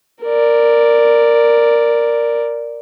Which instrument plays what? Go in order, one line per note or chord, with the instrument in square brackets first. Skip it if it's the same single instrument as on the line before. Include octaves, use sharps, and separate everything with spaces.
[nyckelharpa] A#4 D5